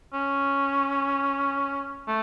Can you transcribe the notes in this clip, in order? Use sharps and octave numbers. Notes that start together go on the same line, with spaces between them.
C#4
A3